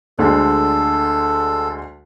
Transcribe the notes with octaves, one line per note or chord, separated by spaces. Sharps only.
D2 D3 G#3 A4